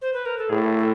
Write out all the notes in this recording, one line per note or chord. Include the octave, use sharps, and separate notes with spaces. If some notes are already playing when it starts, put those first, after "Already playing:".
C5
B4
A#4
A4
A2 G#4
A4